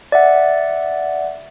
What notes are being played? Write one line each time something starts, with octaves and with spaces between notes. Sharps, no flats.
D5 E5 F#5